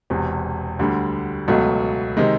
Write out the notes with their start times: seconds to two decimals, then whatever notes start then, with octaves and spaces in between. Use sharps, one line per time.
0.10 E1 E2 C3
0.79 D2 D3 G3
1.48 C#2 B2 F#3 A3
2.17 C3 D#3 G#3